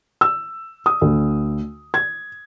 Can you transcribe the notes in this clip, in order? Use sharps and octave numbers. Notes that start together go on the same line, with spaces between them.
E6
D#6
D2
G#6